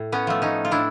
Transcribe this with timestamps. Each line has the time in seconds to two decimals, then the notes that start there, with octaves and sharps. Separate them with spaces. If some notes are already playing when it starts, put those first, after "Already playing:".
Already playing: A2
0.12 B3 C#4
0.27 F3 A3
0.42 C#4 D#4
0.65 F4
0.71 A2 D4 E4